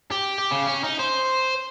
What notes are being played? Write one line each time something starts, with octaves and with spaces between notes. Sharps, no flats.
G4
G4
C#3
C#4
D#4
C5